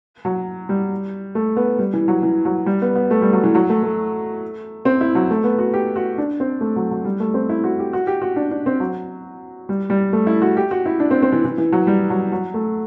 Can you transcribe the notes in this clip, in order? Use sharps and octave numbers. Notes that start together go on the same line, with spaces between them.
F#3
G3
A3
B3
G3
E3
F#3
E3
F#3
G3
B3
B3
A3
G3
F#3
E3
F#3
A3
A3
C4
E4
F#3
A3
B3
F#4
G4
F#4
D4
C4
A3
F#3
F#3
G3
A3
C4
E4
F#4
G4
F#4
G4
F#4
D4
D4
C4
F#3
G3
G3
A3
E4
F#4
G4
F#4
E4
D4
C4
C4
E3
E3
E3
F#3
G3
F#3
F#3
A3